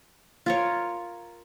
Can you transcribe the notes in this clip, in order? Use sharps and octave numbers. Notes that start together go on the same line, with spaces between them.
F4 A#4 C#5